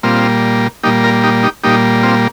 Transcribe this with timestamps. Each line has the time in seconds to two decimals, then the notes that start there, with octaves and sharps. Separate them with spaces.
0.03 A#2 G3 A#3 C4 F4
0.83 A#2 G3 A#3 D#4 G4
1.04 F4 A#4
1.24 D#4 G4
1.43 D#4 G4
1.63 A#2 G3 A#3 D#4 G4
2.03 C4 F4